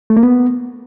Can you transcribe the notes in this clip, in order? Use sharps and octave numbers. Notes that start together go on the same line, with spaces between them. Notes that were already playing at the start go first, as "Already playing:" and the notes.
A3
A#3
B3